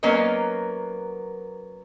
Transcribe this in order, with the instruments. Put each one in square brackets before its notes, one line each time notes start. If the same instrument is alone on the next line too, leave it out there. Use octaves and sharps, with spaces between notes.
[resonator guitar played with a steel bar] F#3 A#3 B3 C#4 A#4 D#5